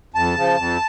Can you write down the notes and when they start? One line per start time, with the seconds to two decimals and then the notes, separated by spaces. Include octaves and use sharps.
0.14 F2 A5
0.36 C#3 F3
0.57 F2